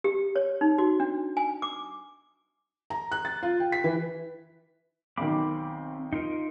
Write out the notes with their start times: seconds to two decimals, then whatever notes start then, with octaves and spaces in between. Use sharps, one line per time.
0.04 G4
0.36 C#5
0.61 D#4
0.78 F#4
1.00 D4
1.37 G#5
1.62 D6
2.90 A#5
3.12 F#6
3.25 A6
3.43 F4
3.60 G5
3.72 B6
3.84 E3
5.17 B1 D#3 C4 B5 D6
6.13 D#4 F4 A#4